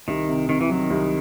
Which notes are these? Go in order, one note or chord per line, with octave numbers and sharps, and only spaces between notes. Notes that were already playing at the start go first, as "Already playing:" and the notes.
C2 D#3
C3
D#3 C4
E3
D#3 F#3
C2